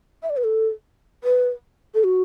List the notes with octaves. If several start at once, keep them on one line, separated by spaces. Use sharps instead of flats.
E5
D5
B4
A4
B4
A4
F#4